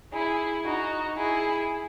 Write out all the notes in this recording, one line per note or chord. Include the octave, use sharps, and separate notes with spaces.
E4 G#4
D#4 F#4
E4 G#4